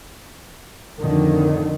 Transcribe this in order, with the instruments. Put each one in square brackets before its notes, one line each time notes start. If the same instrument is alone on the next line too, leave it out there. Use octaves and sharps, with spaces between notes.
[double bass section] F2 A2 D3 D#3